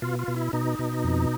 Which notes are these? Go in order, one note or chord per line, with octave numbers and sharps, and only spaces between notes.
B2 F4
F4
B2
E4
B2 D#4
B2
F2